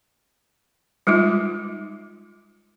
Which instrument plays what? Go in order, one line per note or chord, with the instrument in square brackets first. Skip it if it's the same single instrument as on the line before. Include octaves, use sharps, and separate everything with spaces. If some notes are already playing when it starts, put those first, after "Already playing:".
[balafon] G3 G#3 D#4 F4